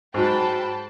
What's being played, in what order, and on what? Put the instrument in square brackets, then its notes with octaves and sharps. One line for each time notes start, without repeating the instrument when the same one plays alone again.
[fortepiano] G#2 F#3 [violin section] G5 A5 B5